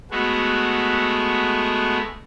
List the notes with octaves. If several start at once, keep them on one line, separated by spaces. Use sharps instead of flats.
G#3 A3 B3 F#4